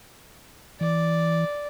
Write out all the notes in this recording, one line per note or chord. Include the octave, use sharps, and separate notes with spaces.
E3 D5